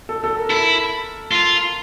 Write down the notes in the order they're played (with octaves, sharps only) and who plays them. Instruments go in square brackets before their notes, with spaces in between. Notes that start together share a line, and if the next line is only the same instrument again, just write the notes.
[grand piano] A4
A4
A#4
[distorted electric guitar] E4 [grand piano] A4
[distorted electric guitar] F4